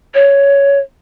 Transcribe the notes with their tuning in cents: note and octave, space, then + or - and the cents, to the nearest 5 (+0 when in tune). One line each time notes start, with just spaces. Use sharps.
C#5 +10